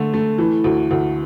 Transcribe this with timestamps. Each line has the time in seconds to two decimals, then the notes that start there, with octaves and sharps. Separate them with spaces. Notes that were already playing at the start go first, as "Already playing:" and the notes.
Already playing: D3 A3
0.14 A3
0.38 E3
0.64 D2
0.91 D2